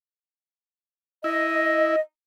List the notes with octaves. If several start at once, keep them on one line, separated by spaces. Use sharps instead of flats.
E4 D#5